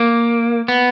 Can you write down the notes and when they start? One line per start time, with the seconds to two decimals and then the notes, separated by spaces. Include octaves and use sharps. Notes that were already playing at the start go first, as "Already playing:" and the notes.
Already playing: A#3
0.68 B3